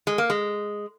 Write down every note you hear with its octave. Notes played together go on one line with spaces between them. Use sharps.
G#3
A#3
G#3